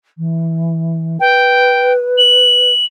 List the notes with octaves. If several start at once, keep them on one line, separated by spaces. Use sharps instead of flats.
E3
B4 G5
F#7